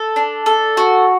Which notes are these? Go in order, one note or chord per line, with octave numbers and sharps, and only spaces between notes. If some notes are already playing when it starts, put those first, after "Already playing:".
Already playing: A4
D4
A4
F#4